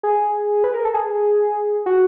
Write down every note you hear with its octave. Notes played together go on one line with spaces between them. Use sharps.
G#4
B4
A#4
A4
G#4
F#4